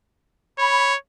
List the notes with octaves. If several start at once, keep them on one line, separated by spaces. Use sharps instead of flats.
C#5 B5